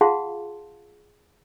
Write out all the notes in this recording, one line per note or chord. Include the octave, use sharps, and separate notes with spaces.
F4 G#4 F5 F#5 A5 C6